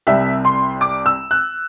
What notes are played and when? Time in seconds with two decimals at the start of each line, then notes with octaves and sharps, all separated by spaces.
0.07 C2 C3 G3 E5
0.45 C6
0.81 D6
1.06 E6
1.31 F#6